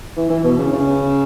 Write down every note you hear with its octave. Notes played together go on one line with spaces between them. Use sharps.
E3
E3
B2
C#3
C#3